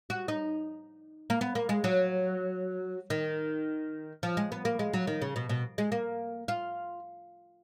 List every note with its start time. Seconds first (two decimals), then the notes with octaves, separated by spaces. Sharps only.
0.10 F#4
0.28 D#4
1.30 A#3
1.41 B3
1.55 A#3
1.69 G#3
1.84 F#3
3.10 D#3
4.23 F3
4.37 G#3
4.52 B3
4.65 A#3
4.79 G#3
4.93 F#3
5.07 D#3
5.22 C#3
5.36 B2
5.49 B2
5.78 G#3
5.92 A#3
6.48 F4